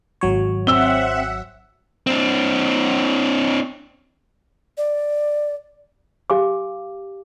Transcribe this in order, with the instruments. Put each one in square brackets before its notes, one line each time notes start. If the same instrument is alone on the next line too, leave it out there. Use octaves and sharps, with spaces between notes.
[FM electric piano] G#1 F#3 C#5
[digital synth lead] C4 [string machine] E5 F#5 [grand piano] E6 G7
[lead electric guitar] C4 D4
[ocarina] D5
[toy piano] G4 F5 G#5 D6